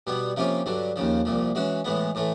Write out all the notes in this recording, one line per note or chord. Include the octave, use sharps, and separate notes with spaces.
B2 G3 B3
C3 F3 A#3 C#4 F4
G2 D3 F#3
D#2 C#3 F3
C2 A#2 F3
E3 G#3 C#4 F#4
A2 E3 G#3 B3
A2 E3 A3